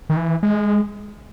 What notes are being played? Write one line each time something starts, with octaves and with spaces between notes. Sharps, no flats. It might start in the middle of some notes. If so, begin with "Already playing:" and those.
D#3
E3
G#3